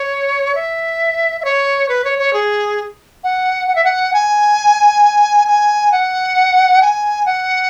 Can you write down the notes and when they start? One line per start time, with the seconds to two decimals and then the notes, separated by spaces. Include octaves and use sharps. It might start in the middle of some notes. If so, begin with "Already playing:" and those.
Already playing: C#5
0.55 E5
1.40 E5
1.44 C#5
1.88 B4
2.04 C#5
2.18 C#5
2.33 G#4
3.24 F#5
3.68 F#5
3.75 E5
3.84 F#5
4.13 G#5
5.48 G#5
5.92 F#5
6.82 G#5
7.26 F#5